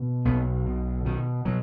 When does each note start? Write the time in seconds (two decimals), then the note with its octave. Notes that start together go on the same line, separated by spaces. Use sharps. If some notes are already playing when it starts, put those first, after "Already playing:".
Already playing: B2
0.25 B1 B3
0.66 B2
1.05 B2 D#3
1.45 B2 F#3